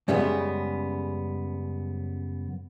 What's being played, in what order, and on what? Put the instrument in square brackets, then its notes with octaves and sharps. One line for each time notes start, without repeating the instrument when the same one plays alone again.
[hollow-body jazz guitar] F#2 C#3 G3 G#3 B3